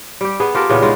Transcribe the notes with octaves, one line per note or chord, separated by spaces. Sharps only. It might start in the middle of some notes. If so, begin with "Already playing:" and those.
G3 G4
B3 G#4
F4 G4 A4 A#4
A#2 C#3 E3 B3
G#3 C#4 D#4 F4